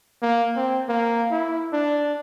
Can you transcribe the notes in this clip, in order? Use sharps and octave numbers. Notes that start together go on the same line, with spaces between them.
A#3
C4
A#3
E4
D4